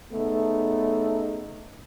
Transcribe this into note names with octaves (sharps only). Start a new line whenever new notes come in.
C#3 A3 B3 D#4